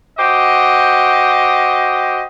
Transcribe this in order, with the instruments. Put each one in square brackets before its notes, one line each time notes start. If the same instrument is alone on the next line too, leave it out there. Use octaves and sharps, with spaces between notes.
[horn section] F#4 G4 C5 D#5